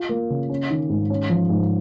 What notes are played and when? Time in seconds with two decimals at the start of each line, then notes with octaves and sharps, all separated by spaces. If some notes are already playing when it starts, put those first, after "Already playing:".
Already playing: F4
0.09 A#3
0.30 C#3
0.49 C#4
0.70 D#3
0.89 G#2
1.10 C#4
1.30 F3
1.50 G#2